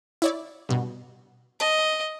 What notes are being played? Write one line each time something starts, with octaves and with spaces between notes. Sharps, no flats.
E4 C#5 D5
G2 B2
D#5 A5